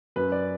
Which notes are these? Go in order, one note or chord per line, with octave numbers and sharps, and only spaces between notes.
F#2 B4
D5